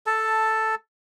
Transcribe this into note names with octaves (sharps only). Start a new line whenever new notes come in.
A4 A5